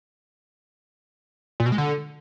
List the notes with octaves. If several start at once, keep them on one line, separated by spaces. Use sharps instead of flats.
A#2
B2
G#3
D3